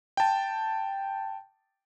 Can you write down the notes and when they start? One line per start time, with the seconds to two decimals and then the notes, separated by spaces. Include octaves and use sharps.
0.17 G5 A5